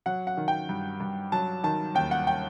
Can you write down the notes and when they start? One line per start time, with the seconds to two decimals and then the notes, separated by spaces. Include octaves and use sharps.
0.06 F#3 F#5
0.27 F#5
0.37 D#3
0.48 G5
0.69 G2
1.00 G2
1.32 F#3 A5
1.63 D#3 A5
1.95 D#2 G5
2.11 F#5
2.27 G5